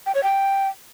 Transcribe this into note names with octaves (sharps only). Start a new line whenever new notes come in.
G5
C#5
G5